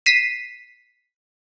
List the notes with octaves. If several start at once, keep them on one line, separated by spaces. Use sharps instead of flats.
B6 C7 D#7 E7